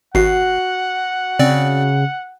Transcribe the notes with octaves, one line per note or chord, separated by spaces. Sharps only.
G#1 F#4 F#5 C7
C#3 C4 D5